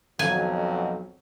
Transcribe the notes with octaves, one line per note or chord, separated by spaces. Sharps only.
B1 F2 F#3 G#5